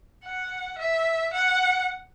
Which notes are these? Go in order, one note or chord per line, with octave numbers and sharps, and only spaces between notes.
F#5
E5
F#5